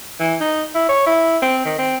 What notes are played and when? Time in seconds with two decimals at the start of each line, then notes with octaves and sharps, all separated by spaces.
0.20 E3
0.41 D#4
0.75 E4
0.89 C#5
1.07 E4
1.42 C4
1.65 D#3
1.79 C4